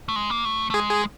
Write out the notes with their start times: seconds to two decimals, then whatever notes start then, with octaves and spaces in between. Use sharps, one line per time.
0.09 A3
0.16 G#3
0.30 A#3
0.45 A3
0.70 A3
0.74 G#3 G#4
0.89 G#4